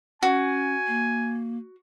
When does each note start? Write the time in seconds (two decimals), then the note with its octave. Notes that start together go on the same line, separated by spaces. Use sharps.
0.23 C#4 F#4 G#5
0.88 A#3